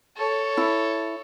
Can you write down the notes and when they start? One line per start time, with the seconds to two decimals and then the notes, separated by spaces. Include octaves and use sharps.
0.16 A4 C#5
0.57 E4